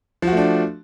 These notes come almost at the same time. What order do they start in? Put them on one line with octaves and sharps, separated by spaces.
F3 F#4 A3 D4